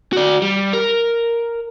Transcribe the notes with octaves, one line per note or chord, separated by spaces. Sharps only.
F#4 D5
G3
A#4